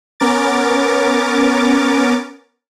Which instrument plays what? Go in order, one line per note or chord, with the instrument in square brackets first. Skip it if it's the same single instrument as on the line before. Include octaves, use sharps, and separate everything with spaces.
[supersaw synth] B3 C#4 A#4 D6 A6